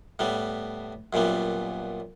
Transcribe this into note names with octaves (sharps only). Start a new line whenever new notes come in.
A2 G3 B3
F#2 A#2 G3 B3